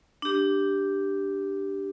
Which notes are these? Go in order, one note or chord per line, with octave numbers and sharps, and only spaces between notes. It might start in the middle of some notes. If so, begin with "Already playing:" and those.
D4 G4